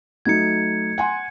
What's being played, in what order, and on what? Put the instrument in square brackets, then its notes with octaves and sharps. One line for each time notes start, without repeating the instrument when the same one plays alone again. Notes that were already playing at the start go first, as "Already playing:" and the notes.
[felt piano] F#3 A3 D#4 [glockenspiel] G#6 C#7
[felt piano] F#5 G#5 C6